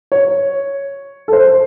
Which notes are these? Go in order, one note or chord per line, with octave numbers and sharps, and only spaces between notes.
C#5
A4
C5